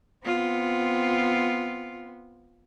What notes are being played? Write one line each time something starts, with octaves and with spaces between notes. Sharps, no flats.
B3 C4 F4